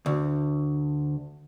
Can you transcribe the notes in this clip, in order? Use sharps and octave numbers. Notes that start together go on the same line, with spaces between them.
D2